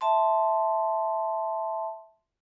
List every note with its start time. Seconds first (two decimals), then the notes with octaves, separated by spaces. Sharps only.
0.01 E5 A5 C6